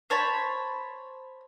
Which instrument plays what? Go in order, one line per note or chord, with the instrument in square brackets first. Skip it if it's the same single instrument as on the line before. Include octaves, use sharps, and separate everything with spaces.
[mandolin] C5 C#5 A5 B5